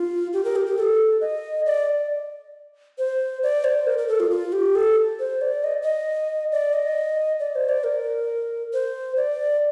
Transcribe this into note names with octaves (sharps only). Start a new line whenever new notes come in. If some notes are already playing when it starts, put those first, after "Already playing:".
Already playing: F4
G4
A#4
G4
G4
A4
D#5
D5
C5
D5
C5
A#4
A#4
A4
F4
F4
G4
A4
C5
D5
D#5
D#5
D5
D#5
D5
C5
D5
A#4
C5
D5